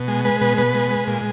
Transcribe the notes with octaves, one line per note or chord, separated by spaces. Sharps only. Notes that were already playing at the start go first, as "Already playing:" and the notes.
Already playing: B2
G#3
G#3 B4
B2 B4
B2 B4
G#3
G#3
A#2